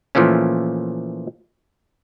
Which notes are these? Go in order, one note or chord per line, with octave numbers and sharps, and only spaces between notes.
A#2 E3 F3 A3 C#4